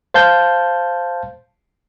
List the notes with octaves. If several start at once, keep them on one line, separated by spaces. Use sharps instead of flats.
C5 F5 A5 G6